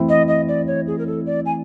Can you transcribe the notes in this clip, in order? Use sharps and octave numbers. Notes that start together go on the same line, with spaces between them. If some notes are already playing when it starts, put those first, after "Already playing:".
Already playing: E3 A3 C4 E4
D#5
D#5
D5
C#5
G#4
A#4
A4
D5
G#5